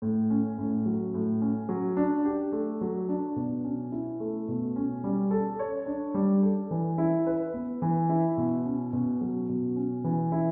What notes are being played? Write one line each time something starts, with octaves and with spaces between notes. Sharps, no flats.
A2
C#4
A2
F#3
A2
C#4
F#3
D4
G4
A3
F#3
D4
B2
C#4
E4
A3
B2
C#4
G3
A4
C#5
D4
G3
A4
E3
E4
B4
B3
E3
E4
B2
C#4
B2
F#3
B2
C#4
E3
E4